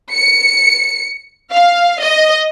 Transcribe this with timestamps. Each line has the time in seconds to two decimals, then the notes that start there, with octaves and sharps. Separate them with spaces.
0.13 C#7
1.51 F5
2.00 D#5